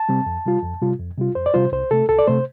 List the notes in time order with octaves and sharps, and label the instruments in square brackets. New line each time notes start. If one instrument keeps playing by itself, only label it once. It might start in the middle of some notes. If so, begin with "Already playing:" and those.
Already playing: [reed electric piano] A5
C3 G3 C4
F2
C3 G3 F4
F2
C3 G3 F4
F2
C3 G3 F4
F2 C5
D5
C3 G3 F4 C5
C2 C5
C3 A3 A4
C2 A4
D5
C3 A3 C5